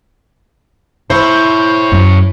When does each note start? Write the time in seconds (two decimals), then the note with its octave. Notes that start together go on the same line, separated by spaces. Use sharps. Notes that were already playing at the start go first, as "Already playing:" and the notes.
1.10 E4 A4 C5 C#5
1.92 F#2